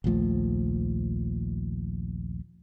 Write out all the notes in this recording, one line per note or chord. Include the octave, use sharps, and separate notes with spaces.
A#1 D#2 F3 A3